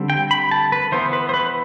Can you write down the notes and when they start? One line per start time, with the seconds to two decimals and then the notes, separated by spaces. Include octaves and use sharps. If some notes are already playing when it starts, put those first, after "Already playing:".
Already playing: D3 G3 C4
0.10 G5
0.31 B5
0.51 A5
0.72 B4
0.92 E3 B3 C5
1.13 B4
1.29 C5
1.34 B4